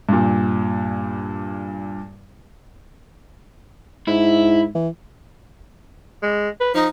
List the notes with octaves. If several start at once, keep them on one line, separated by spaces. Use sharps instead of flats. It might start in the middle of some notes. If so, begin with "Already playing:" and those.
G2 A#2
G#2 E4
E3
G#3
B4
F3 D#4